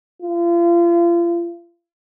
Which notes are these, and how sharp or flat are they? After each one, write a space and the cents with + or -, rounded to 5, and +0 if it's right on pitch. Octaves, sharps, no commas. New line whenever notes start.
F4 -35